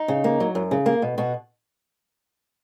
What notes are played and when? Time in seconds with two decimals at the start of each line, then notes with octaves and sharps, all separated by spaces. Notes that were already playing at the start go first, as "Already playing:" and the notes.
Already playing: D#4
0.08 C#3
0.24 A#3
0.40 F#3
0.55 F#2
0.71 C#3
0.86 A#3
1.02 B2
1.18 B2 F#4